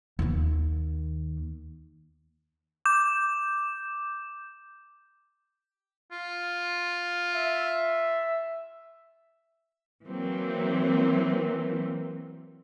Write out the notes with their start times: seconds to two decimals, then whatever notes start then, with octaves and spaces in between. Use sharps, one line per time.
0.19 D#2 D#3
2.85 D6 G6 E7
6.11 F4
7.33 E5
10.06 E3 F#3 A#3 C4